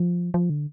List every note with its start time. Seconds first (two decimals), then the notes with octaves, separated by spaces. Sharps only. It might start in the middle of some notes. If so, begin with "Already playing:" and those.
Already playing: F3
0.34 F3
0.50 D3